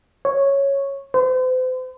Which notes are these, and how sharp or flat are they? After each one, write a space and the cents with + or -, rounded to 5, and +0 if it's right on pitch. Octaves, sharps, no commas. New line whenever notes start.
C#5 -5
C5 -40